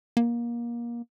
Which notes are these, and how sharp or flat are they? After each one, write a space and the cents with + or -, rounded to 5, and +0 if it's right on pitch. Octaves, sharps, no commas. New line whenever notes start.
A#3 +25